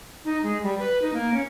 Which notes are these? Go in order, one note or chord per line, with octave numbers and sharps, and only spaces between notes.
D#4
G#3
G3
B4
D#4
A#3
C#4